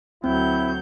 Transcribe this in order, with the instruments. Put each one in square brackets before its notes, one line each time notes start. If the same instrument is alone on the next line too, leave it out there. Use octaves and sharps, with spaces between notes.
[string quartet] D2 F#3 G6 [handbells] C4 [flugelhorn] E4